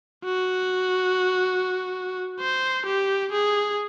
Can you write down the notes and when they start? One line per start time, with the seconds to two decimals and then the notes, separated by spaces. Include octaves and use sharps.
0.25 F#4
2.40 C5
2.86 G4
3.32 G#4